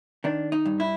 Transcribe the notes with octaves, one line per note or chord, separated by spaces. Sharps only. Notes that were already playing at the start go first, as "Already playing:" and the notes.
D#3 D4
D#4
G2
E4